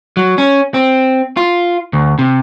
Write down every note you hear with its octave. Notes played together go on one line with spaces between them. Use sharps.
F#3
C#4
C4
F4
D2
C3